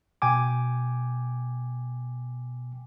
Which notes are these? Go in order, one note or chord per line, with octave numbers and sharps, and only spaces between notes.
B2 G5 G#5 D6